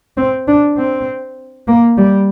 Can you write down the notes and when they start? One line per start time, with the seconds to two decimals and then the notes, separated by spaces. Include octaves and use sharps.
0.17 C4
0.48 D4
0.78 C4
1.68 A#3
1.98 G3